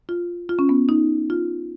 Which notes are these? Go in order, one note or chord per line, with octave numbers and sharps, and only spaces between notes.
F4
F4
C#4
B3
D#4
F4